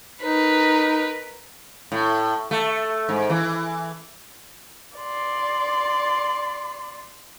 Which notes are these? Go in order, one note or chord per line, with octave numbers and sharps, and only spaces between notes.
D#4 A#4 B4
A2
A3
G#2
E3
D5 C6